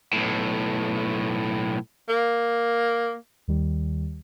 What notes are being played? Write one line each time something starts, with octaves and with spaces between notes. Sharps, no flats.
B1 A2
A#3
D#2 D#3 G3